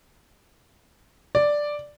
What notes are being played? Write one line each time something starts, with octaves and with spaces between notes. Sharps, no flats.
D5